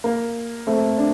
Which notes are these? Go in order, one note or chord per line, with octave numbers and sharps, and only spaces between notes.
A#3
A3 C4
D4